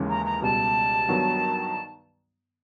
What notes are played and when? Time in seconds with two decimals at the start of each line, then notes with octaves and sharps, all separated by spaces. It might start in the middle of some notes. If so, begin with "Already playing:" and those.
Already playing: D#2 C#3 E3 G#3 C#4
0.09 A#5
0.25 A#5
0.42 C#2 B2 G3 A5
1.08 G2 D#3 F#3 B3